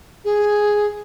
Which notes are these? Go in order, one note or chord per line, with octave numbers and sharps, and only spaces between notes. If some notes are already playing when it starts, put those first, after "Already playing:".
G#4